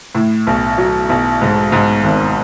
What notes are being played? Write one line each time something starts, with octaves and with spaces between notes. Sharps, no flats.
A2
B1
F#3
B1
G#2
G#2
G#1